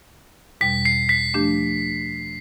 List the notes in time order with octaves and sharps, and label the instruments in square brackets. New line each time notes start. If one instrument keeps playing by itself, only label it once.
[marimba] E2 B2 G3 [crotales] B6
[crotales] C7
B6
[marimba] F3 A3 D4 G4